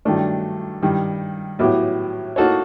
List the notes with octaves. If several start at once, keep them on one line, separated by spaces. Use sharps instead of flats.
G2 D#3 F#3 A3 D4
G2 D#3 G3
A2 F#3 B3 E4 G4
A#3 D#4 F#4 A4 C#5